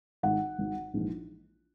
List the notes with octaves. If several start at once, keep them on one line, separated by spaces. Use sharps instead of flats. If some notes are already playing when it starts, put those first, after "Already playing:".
G#1 G#2 D#3 F#5
G#1 G#2 D#3
A#1 G#2 E3